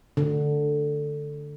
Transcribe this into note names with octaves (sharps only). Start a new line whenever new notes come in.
D3